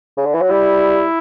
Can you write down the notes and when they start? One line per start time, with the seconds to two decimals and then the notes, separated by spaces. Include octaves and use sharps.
0.17 C#3
0.25 D3
0.34 E3
0.41 F#3
0.50 G3 E4